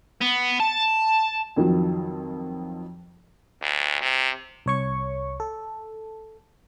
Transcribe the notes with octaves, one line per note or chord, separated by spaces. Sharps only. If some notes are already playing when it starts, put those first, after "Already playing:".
B3
A5
F2 D#3 F3 F#3
D2
C3
C2 C#5 C#6
A4